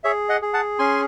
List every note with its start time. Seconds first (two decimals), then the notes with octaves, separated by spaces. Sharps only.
0.04 G#4 C#5 E5
0.29 D#5 F#5
0.42 G#4
0.53 F#5 A5
0.79 C#4 G#5 C6